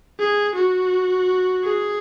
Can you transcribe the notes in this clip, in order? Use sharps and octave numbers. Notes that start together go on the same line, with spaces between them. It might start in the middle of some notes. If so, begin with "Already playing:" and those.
G#4
F#4
G#4